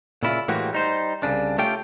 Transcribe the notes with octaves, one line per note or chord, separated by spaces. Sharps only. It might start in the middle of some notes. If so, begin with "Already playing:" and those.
A#2 C#3 E4 F4
A2 E3 G#3 A#3 F#4 G4
G3 D#4 C5
C2 C#3 D4
A3 C#4 F4 G4 G5